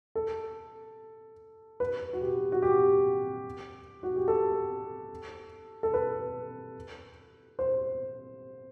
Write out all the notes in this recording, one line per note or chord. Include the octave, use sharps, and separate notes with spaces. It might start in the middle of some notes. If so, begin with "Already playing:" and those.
A4
B4
F#4
G4
F#4
G4
F#4
G4
A4
A4
B4
C5